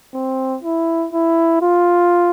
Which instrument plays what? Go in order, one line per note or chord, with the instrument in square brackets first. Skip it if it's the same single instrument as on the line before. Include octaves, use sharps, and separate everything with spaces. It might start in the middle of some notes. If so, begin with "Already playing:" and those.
[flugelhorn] C4
E4
E4
F4